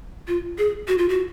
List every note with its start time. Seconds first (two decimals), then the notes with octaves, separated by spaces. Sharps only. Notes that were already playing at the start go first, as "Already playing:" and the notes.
0.28 F4
0.58 G#4
0.88 F#4
0.98 F4
1.09 F#4